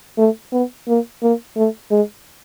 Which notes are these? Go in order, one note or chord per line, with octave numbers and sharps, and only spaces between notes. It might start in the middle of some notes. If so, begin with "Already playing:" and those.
A3
B3
A#3
A#3
A3
G#3